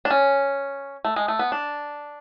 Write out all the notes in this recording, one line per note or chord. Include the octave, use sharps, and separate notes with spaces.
D4
C#4
A3
G#3
A3
B3
D4